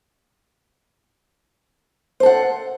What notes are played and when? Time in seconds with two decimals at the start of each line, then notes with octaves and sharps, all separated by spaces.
2.20 C5
2.23 A4
2.26 F#5